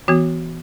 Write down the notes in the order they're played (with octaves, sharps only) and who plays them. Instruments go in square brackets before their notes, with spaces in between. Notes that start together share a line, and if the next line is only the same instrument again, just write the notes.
[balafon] E3 B3 F#4